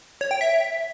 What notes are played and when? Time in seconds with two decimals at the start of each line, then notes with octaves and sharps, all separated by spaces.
0.21 C#5
0.31 G5
0.41 E5